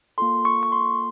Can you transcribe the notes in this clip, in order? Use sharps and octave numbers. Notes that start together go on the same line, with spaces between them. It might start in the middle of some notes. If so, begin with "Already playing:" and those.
A#3 F4 A4 C6
C#6
C#6
C6